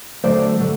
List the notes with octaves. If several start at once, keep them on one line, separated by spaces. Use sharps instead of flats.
D3 F#3 A3 D4 C5 D5
D3 F#3 A3